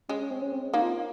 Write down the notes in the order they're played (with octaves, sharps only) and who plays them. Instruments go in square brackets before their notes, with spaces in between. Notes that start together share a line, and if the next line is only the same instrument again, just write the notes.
[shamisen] G#3 [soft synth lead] C#4
[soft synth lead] C#4
C4
C#4
C4
[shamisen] A#3 [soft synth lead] D#4
[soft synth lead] F4